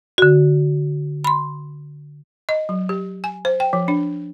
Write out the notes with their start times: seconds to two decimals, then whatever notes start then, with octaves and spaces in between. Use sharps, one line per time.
0.18 D3 F#4
1.24 B5 C6
2.49 D#5
2.69 F#3
2.89 G4
3.24 G#5
3.45 C5
3.60 G5
3.73 F3
3.88 D4